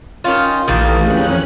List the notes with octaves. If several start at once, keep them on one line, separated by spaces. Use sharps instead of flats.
D#3 C#4 F4
A#1 D#3 E3 G3 A3 A#3 F4 D#6
F2 C#4 E4 G#4 B4 F#6